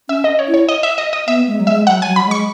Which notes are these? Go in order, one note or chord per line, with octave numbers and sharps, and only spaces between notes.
C#4 E5
D#5
C#5
E4
C#5
D#5
E5
D#5
D#5
B3 E5
G#3
F#3
G#3 E5
F#3 F#5
G#5
F#3
B5
G#3
C#6